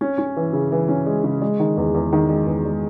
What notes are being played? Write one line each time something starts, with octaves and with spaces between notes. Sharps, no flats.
C#4
C#4
E3
C#3
E3
C#4
G#3
C#3
G#3
D#3
E2
E2
D#3
G#3
E2
G#3